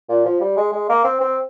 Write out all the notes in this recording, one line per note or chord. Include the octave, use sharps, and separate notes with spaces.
A#2
F3
G3
G#3
G#3
A#3
C4
C4